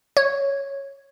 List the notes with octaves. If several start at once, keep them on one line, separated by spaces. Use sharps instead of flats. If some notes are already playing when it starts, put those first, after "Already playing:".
C#5